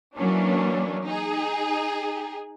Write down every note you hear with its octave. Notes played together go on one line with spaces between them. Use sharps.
E3 F#3 A#3 C#4 D4
D#4 G#4